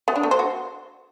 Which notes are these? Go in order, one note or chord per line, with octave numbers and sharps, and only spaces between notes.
B3
D4
A3
C5
F#4